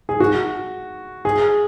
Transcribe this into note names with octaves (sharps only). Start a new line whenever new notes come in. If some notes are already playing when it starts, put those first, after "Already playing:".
G#4
F#4
G#4